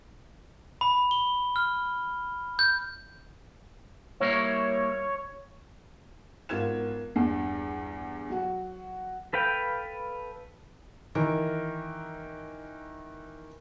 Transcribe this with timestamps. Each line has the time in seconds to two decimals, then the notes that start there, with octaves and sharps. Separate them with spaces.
0.81 B5
1.11 G7
1.56 F6
2.59 G6
4.20 G3 A#3 E4 C#5
6.49 G#1 B3 F4 A#4 G#6 E7
7.16 E2 G2
8.30 F#3 F#4
9.33 A4 B4 F5 G5
11.15 D#3 E3 A#4